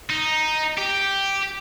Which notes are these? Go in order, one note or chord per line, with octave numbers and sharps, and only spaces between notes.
D#4
G4